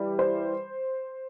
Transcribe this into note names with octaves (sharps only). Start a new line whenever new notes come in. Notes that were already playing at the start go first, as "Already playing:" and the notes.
Already playing: E3 G3
C5